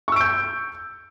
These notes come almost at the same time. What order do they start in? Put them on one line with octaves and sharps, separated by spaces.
C#6 E6 D7 G6